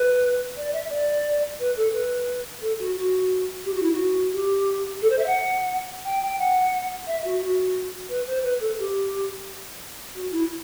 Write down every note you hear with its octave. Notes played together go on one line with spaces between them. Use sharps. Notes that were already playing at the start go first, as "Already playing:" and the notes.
Already playing: B4
D5
E5
D5
B4
A4
B4
A4
F#4
F#4
G4
F#4
E4
F#4
G4
A4
C5
E5
F#5
G5
G5
F#5
E5
F#4
F#4
B4
C5
B4
A4
G4
F#4
E4